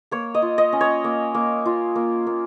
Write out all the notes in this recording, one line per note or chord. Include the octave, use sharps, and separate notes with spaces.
A#3 C#5
D#5
F4
D#5
C#4
C#5
A#3
A#3
F4
A#3
A#3